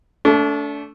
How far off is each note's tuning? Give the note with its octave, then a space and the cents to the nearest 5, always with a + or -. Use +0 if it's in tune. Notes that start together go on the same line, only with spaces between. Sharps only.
A3 +0 D4 -35